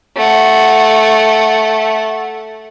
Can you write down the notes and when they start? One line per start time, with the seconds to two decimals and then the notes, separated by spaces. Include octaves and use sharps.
0.17 A3 F#5